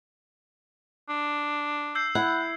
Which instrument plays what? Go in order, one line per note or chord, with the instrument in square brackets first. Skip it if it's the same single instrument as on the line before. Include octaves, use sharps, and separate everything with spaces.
[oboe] D4
[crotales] E6 G6 C7
[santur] E4 [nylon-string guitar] F#5